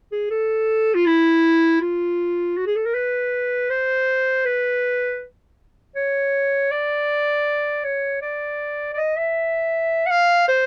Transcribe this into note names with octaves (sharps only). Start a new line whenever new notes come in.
G#4
A4
F4
E4
F4
F#4
G#4
A4
A#4
B4
C5
B4
C#5
D5
C#5
D5
D5
D#5
E5
F#5
F5
C5